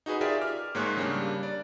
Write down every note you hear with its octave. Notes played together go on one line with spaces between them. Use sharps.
D#4 F#4 G#4 B4
F4 G4 G#4 A#4 D5 E5
D6 F6
G#2 G#3 A#3 C#5 C#6 F#6
C#3 G3 A#3 D4
D5